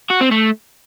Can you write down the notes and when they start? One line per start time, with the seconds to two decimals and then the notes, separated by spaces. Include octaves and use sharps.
0.10 F#4
0.21 C4
0.32 A3